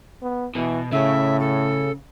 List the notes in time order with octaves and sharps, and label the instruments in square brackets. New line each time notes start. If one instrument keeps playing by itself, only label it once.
[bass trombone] B3
[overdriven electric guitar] B2 [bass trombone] E3
[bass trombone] A2 [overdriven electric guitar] C#3 [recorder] E5
[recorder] A4